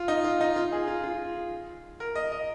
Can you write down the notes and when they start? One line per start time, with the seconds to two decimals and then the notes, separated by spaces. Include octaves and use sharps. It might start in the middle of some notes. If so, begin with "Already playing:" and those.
Already playing: F4
0.08 D#4
0.24 F4
0.41 D#4
0.56 F4
0.72 G#4
0.88 F4
1.04 F4
2.00 A#4
2.15 D#5
2.32 D#5